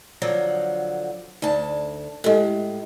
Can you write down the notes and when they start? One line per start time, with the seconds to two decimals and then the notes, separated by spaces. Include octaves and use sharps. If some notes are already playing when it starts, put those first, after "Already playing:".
0.22 D3 F3 F#3
1.42 D2 D#4 D5 A5
2.24 A2 G#3 E4 G4 A4